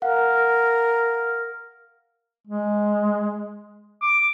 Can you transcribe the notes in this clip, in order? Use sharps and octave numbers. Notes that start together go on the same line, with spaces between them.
A#4 F5 F#5
G#3
D6